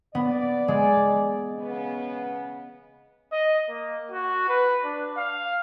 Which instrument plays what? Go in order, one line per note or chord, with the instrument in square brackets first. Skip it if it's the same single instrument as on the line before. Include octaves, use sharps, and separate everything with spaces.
[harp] B3 [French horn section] D5
[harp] G#3
[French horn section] C#3 B3
[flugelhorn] D#5
A#3
F#4
B4
D4
F5